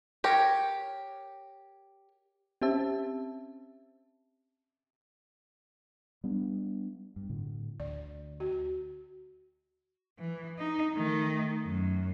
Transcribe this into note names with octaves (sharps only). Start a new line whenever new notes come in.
G4 A#4 C#5
C4 C#4 G4 C5 E5 A5
G3 B3 D4
G2
A2 D3
D2 D5
F#4
E3
D#4
D#3 A3
F#2